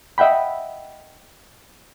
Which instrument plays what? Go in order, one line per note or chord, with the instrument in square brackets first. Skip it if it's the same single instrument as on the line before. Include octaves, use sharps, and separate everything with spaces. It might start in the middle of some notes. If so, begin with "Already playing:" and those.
[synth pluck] D#5 E5 F#5 G5 B5